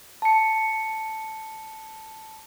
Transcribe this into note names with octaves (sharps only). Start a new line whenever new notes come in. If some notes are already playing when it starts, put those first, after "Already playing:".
A5 C#7